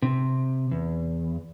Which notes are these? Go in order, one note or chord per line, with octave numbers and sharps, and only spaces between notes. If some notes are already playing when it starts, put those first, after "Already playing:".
C3
E2